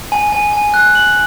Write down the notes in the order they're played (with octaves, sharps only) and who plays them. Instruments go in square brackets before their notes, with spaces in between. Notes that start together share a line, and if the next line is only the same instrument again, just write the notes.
[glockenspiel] G#5
G#5
G#5
F#6
F#7